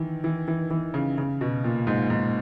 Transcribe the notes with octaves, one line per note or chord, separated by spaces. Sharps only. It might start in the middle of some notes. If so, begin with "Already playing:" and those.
Already playing: D#3 E3
E3
E3
E3
C#3
C#3
B2
A#2
G#2
G#2